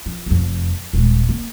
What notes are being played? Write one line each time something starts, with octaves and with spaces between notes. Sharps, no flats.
F3
F1 F2
D#1 G#3
A#3